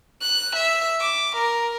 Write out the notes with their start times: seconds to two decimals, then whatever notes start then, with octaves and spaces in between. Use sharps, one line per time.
0.21 F#6
0.55 E5
1.00 D6
1.36 A#4